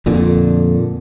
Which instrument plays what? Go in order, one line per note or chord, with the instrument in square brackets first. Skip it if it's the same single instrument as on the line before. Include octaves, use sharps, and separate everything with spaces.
[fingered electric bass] F2 A#2 D3